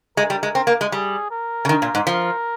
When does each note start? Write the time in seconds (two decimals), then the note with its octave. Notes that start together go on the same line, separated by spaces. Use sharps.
0.17 G#3 A#4
0.30 G3
0.43 G#3
0.55 C4
0.67 A#3
0.81 G#3
0.92 G3 G#4
1.31 A#4
1.65 C#3
1.69 D#3
1.82 A#2
1.95 G#2
2.07 F3 A#4